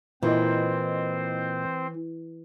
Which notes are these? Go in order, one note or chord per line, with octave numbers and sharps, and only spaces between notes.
A#2 E3 C4 E4 C5 D#5